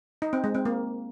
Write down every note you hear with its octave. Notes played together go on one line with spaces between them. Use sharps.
D#4
C4
G#3
C4
A#3